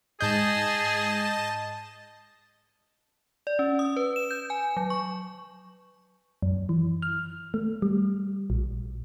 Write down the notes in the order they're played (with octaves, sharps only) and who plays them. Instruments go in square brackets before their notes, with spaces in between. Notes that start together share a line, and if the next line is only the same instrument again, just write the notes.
[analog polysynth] G#2 G6 [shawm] G#4 [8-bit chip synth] D#5 A5
[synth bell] D5
C#4
D#6
B4
E7
G6
G#5
F#3
C#6
[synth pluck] F#2
E3
F6
A3
G3
A#1